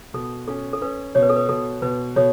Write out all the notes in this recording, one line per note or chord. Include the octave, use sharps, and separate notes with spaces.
B2 A4
C#4 A4
A4
C#4 B4
B2 C#5
B4
A4
B4
B2 A4
B2 B4
B2 A4 C#5